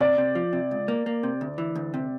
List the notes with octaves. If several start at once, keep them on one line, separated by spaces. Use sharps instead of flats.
C3 D5
C3
F3
C3
C#2
A#3
A#3
C3
D2
E3
D2
C3